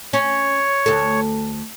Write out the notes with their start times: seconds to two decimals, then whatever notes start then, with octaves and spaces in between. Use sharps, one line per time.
0.13 C#4 C#5
0.86 D2 A4